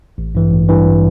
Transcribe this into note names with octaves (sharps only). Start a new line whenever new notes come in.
A1
G2 E3
A1
G2 E3